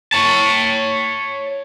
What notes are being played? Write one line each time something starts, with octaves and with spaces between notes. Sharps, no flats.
C#5 A5